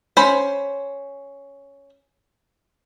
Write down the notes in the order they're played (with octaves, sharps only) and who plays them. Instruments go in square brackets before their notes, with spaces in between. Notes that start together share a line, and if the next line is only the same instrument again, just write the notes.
[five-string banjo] C#4 C5 B5